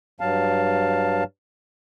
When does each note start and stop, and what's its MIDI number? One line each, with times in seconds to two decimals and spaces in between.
0.20 1.24 43
0.20 1.24 54
0.20 1.24 77
0.20 1.24 81